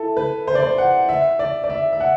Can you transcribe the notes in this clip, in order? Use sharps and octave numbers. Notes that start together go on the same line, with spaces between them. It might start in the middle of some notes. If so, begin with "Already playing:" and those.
Already playing: E4 A4
B4
C5
D5
C5
F#5
E5
D5
D5
E5
E5
F#5